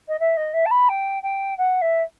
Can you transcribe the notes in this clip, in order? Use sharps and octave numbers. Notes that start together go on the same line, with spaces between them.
D#5
E5
D#5
E5
A5
B5
G5
G5
F#5
E5